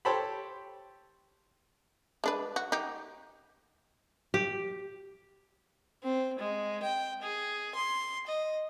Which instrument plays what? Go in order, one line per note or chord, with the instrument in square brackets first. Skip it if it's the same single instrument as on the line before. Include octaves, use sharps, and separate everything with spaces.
[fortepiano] G4 A4 C5 C#5 G5 B5
[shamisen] G#3 D4 B4
F#4
D#4 G4
[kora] G4
[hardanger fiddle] C4
G#3
G5
G#4
C6
D#5